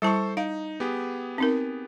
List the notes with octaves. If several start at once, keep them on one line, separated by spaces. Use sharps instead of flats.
G3 E4 A4 C5 A5 C#6
D#4 F5
B3 G4 G#4
C4 D#4 A#4